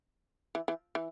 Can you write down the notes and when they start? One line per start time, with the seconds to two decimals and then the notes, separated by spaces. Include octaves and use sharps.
0.55 E3
0.68 E3
0.95 E3